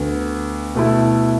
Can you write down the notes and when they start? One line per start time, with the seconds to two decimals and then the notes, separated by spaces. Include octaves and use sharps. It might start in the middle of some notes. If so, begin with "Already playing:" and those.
Already playing: D2 D3 B3
0.75 B2 A3 E4 A4